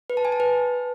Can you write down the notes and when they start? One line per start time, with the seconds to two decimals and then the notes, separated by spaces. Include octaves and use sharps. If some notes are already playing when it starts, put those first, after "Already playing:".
0.10 B4
0.17 A5
0.25 G#5
0.32 A5
0.40 B4